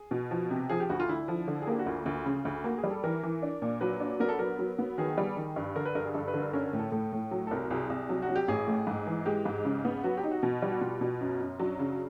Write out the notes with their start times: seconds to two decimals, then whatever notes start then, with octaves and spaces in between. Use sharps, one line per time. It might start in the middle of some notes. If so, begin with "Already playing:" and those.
Already playing: G#4
0.11 B2
0.31 F3
0.50 C3
0.69 F3 G#4
0.80 G4
0.90 D2 F#4
1.00 F4
1.09 D3 E4
1.28 F3
1.48 D3
1.62 G#4
1.67 A#3 G4
1.79 F#4
1.86 D2 F4
2.06 D2
2.26 C#3
2.45 D2
2.64 A#3 F#4
2.78 G#4
2.84 G3
2.91 A4
3.04 E3 A#4
3.23 E3
3.42 D4
3.62 A#2
3.81 F#3 B4
4.00 D4
4.20 B3 A#4
4.29 A4
4.39 F#3 A#4
4.59 F#3
4.79 B3
4.98 D#3 G#4
5.18 G3
5.37 D#3
5.56 G2
5.76 D3 A#4
5.85 B4
5.95 G2 A#4
6.06 G#4
6.14 G2 A4
6.28 B4
6.34 D3
6.40 A#4
6.53 C#4 A#4
6.66 A#4
6.73 A2
6.79 A4
6.92 A2 A4
7.13 A2
7.31 F#3
7.47 A4
7.51 C2 A#4
7.70 C2 G#4
7.90 C2
8.09 F#3
8.22 F#4
8.29 F#3
8.36 G4
8.48 A1 G#4
8.68 A2
8.87 G#2
9.07 E3
9.26 G#3 G4
9.45 G#2
9.65 C#3
9.85 B3
10.04 F#3 F#4
10.17 G4
10.23 D#4
10.31 F#4
10.43 B2
10.62 G3
10.72 F#4
10.81 B2 F4
11.01 B2
11.21 F#2
11.40 F#2
11.59 F#3 D4
11.79 C#3